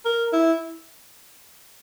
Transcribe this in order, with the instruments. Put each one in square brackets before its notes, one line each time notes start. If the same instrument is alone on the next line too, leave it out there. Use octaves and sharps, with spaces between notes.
[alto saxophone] A#4
E4